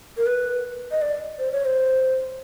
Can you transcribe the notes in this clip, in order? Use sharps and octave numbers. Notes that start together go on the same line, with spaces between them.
A#4
B4
D#5
D5
C5
C#5
C5